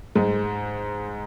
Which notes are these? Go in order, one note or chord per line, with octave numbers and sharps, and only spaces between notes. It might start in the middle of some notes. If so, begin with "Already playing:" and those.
G#2 G#3